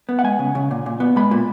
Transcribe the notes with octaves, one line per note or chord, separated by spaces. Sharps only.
B3
F#5
G#3 G#5
C#3
C#3
A#2
A#2
B3
G#3 B5
A#2